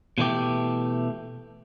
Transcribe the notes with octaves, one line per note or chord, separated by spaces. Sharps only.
B2 E3 A3 G4